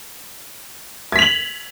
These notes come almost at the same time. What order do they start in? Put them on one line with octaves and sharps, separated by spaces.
G#6 B6 F7 F#7